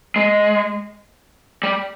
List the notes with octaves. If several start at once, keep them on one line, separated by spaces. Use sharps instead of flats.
G#3
G3